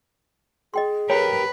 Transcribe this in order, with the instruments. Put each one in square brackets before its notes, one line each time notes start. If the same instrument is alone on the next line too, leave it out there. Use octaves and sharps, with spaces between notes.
[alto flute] G#4 [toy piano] D#5 G5 C6
[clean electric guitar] G4 A#4 [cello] B4 [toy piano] C#5 G5 B5